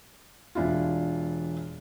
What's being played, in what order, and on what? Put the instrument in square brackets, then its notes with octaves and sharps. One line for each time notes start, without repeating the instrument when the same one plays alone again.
[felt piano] E1 D4 E4 F4